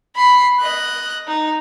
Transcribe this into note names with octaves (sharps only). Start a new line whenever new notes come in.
B5 C7
D#5 F#6
D#4